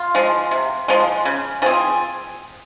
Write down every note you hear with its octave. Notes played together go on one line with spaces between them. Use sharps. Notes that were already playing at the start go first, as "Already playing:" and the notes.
Already playing: F4
F3 G#3
C3
F3 G#3
C#3
F3 C4 G#4